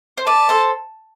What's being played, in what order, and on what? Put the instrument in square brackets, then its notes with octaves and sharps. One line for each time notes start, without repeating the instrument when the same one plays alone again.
[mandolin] C5
[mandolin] B4 D5 [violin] A5
[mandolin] A4 C5